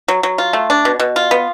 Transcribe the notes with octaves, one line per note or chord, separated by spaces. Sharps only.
F#3
F#3
F4
A3
D4
B2
B2
F4
B3